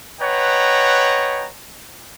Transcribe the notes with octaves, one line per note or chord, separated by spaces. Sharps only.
B4 C#5 D#5 F#5 G5 A#5